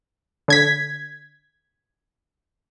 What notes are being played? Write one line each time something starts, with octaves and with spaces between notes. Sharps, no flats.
D3 G#6 B6